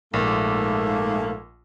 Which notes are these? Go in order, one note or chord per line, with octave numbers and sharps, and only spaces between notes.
A#1 G#2 A3 A#3